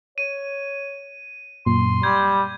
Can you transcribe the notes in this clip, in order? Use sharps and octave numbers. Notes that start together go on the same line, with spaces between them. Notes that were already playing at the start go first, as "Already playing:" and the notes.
C#5 D#7
F#2 A#2 C6
G3 G6 G#6